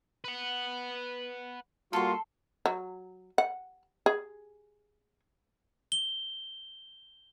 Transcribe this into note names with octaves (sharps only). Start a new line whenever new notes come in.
B4 F#5
G3 A#3 F4 F#4 A4 C6
F#3
F#5
G#4
G7